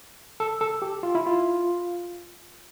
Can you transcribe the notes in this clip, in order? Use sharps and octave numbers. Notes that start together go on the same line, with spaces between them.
A4
A4
G4
F4
E4
F4